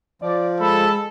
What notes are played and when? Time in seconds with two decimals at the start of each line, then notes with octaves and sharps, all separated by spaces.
0.22 F3 D5
0.60 G#3 A4 B5